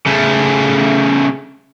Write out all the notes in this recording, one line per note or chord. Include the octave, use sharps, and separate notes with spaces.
C#3 A3